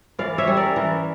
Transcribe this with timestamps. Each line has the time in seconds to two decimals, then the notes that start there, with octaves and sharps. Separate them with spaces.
0.19 E3 D5 F5
0.38 C#5 E5
0.47 G3 C#4
0.57 A#4 D5
0.76 E3